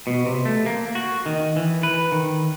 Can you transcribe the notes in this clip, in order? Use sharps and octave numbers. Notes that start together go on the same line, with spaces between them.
B2
C3
A3
A#3
F#4
D#3
E3
B4
D#3